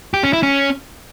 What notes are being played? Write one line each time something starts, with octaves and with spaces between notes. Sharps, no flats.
G4
C#4
E4
C#4